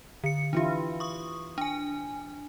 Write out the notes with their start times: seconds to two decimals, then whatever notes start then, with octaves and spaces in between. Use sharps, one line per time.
0.24 D3 C#7
0.53 E3 D4 E4 F4 G4
1.00 C#6 D#6
1.58 D4 G#5